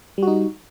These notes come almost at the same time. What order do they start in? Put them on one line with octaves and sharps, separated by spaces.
G3 F#4 D#4